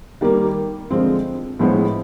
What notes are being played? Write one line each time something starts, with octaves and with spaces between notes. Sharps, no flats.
D#3 G3 A#3
D3 F3 G#3 C4 F4
A2 F3 G#3 B3